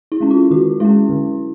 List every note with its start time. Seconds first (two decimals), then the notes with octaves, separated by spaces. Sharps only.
0.12 E4
0.21 G#3 C#4
0.31 F4
0.51 D#3 F#4
0.80 G#3 C#4 E4
1.09 D3